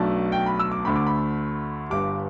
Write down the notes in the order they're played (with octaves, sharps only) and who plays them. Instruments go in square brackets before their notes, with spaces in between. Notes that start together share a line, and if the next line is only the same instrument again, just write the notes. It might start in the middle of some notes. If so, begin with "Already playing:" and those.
Already playing: [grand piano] B1 B2 A3 D4 A5
G5
B5
E6
D6
D2 D3 A3 B5
D6
B5
G1 G2 G3 D6